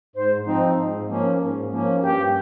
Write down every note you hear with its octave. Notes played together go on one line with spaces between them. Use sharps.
G#2 C5
F3 C4 D#4
G#2
F3 A#3 C#4
G#2
F3 A#3 C#4
G2 G4